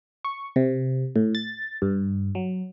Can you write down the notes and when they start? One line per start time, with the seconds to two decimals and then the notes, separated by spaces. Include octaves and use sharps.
0.25 C#6
0.56 C3
1.16 A2
1.35 A6
1.82 G2
2.35 F#3